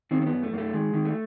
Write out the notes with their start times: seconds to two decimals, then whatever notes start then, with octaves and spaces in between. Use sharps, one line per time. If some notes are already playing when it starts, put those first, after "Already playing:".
0.11 D#3 C4
0.22 C4
0.27 B3
0.33 F#2
0.43 A3
0.53 F#2 A#3
0.58 A3
0.74 D#3 G#3
0.94 D#3
1.05 A3